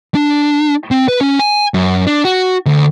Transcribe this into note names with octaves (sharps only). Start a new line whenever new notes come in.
D4
C4
B4
C#4
G#5
F#2
D4
F#4
D2